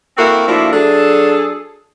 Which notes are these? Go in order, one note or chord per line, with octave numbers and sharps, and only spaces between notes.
A#3 C4 E4 F#4 A4 A#4
F3 A3 A#3 D4 E4 F#4
F#3 D4 G#4 A4